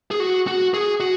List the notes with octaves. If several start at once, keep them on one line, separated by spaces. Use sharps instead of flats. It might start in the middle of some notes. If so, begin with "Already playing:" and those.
G#4
F#4
F#4
G#4
F#4